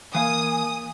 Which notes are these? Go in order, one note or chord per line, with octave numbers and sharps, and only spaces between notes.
E3 A#3 F5 G#5 D#6